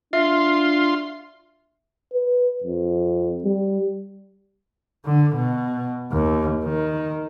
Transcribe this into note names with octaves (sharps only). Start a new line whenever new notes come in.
D4 F4 E5 C6
B4
F2
G3
D3
B2
D#2
D#3